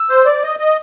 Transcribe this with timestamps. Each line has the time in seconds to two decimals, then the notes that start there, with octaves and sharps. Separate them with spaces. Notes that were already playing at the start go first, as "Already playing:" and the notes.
Already playing: E6
0.10 C5
0.26 D5
0.43 D#5
0.60 D#5